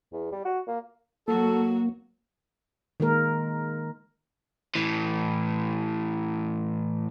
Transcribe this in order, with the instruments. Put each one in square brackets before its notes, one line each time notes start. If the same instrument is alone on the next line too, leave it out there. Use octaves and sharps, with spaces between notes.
[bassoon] E2
G3
F#4
A#3
[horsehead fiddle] F#3 F#4 [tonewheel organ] A#3 [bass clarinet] A4
[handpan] D#3 G#3 A#3 A#4
[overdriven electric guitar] A2 E3